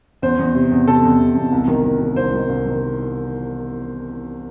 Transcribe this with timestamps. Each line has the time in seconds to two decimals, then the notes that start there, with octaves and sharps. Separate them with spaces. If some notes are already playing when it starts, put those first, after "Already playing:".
0.22 E2 C5
0.39 E2
0.55 C3
0.72 E2
0.87 C3 A4
1.04 E2
1.20 C3
1.36 E2
1.52 C2
1.68 D#3
1.85 D#3
2.01 D#3
2.16 C2 C5
2.34 D#3
2.49 C2
2.66 D#3